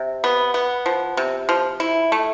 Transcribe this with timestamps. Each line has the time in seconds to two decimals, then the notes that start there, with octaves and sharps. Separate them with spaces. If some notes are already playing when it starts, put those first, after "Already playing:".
Already playing: C3
0.24 B3
0.54 B3
0.86 F3
1.17 C3
1.49 F3
1.80 E4
2.12 A3